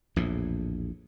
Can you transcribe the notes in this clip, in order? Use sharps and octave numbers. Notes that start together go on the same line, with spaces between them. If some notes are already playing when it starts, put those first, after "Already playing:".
A#1 E2 A2